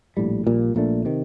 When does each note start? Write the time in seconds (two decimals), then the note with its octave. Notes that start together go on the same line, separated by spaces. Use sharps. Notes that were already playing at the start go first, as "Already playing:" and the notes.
0.17 A#1 A2 G3
0.47 A#1 A#2 G3
0.75 A#1 A#2 A3 D4
1.05 C3 D#3